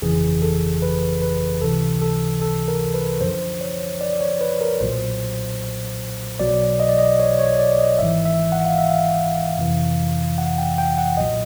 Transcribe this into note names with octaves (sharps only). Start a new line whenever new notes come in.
G1 F2 C#3 E3 G#4
A4
B4
B4
C#2 C3 E3 A4
A4
A4
A#4
B4
F#2 D3 F3 C5
C#5
D5
C#5
B4
A#4
B1 A#2 F#3 C5
B1 B2 F#3 D5
D#5
D5
D#5
C#5
C#5
D5
D#5
G#1 G#2 E3 E5
E5
F#5
F5
E5
F5
F2 C3 E3
F#5
G5
G5
F#5
B1 A#2 F#3 D#5